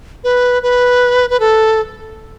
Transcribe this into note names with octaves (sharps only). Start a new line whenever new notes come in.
B4
B4
B4
A4